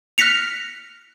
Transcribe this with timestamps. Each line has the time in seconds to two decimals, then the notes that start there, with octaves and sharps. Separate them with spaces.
0.18 F6 F#6 A#6 B6 C#7 F7